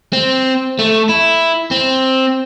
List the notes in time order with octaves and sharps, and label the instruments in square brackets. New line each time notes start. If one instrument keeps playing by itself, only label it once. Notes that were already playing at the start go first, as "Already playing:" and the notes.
[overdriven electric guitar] C4
A3
E4
C4